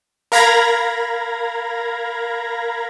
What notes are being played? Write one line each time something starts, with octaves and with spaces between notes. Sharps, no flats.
A#4 F5 A#5 B5 G#6 A#6